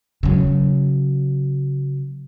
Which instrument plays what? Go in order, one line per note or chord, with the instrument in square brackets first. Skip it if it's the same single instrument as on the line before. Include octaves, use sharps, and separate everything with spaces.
[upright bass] C#3 F#3